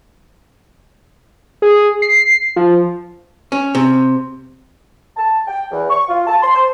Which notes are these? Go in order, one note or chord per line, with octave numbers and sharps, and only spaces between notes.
G#4
C7
F3
C#4
C3
A5
G5
E2
C#6
F4
A5
C6
C5